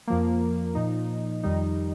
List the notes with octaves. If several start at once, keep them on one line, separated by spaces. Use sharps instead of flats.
F2 F3 A#3
A#2 F3 D#4
F2 D#3 G3 D#4